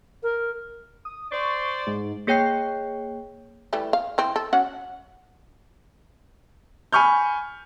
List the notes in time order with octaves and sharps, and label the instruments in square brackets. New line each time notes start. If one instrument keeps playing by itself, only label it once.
[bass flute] A#4
[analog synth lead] D#6
[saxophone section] C5 D5 [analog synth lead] C#6
[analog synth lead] G#2
[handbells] A#3 G#4 C#5 G5 G6 C7
[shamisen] E3 G3 A3
F5
E3 C4
A4
C#4 F#4 F#5
[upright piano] G#5 B5 C#6 F6 G6